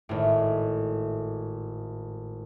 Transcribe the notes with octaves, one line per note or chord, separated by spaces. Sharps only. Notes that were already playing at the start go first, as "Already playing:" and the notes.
G#1 A2